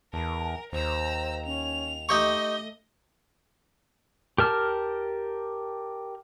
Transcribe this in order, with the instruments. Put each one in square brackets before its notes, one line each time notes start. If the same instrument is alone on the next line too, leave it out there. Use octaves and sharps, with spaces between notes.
[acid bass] E2 [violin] A#4 [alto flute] A5
[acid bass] D#2 [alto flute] C5 [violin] A#5 E6
[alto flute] C#4 [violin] F7
[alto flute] A3 [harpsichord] D#4 G4 C#6 [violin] D#5
[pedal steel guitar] G4 A#4 A5 F6